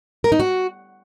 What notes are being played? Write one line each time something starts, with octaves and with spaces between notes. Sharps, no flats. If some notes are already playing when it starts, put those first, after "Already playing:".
A#4
D#4
F#4